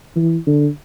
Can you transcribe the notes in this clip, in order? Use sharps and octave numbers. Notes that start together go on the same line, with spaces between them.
E3
D3